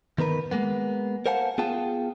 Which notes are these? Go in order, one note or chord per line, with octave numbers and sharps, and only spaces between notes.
D#3 B3 A#4 B4
G#3 A#3 B3
A#4 C5 F5 F#5 G#5 A5
B3 F4 G#4 F5 G5 A5